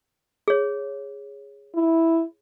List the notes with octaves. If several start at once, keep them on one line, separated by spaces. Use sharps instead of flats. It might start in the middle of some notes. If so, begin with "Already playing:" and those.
G#4 C#5
E4